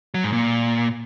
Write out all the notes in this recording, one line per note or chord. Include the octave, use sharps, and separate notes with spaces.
F#3
G#2
A#2